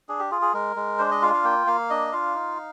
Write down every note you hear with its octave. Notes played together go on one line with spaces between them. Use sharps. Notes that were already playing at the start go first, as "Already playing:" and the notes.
D4 G#4
G4
F4 G#4
G#4
G#3 A#4
G#3
D4 C5
D#5
F4 F5
F5
A#3 G5
A#3 F5
D4 D#5
F4 F5
D#4